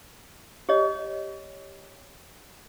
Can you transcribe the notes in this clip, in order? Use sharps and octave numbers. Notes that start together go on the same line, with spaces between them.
G4 C#5 D#5